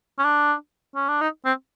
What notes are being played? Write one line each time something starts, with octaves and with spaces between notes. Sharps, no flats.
C#4
D4
C#4
D4
D#4
C4